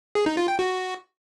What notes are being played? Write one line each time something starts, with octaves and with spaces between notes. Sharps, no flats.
G#4
D#4
F4
G5
F#4